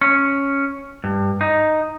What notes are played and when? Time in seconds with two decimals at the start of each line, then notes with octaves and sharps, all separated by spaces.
0.01 C#4
1.04 G2
1.41 D#4